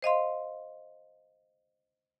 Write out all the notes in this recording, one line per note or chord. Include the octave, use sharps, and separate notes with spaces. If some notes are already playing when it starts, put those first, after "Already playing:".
C5 D#5 F5 C6